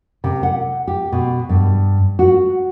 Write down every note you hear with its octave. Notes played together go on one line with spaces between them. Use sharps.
C3
F#5
G4
B2
G2
F#4